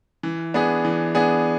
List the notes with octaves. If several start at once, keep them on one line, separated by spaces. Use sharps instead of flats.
E3
B3 D4 G#4
E3
B3 D4 G#4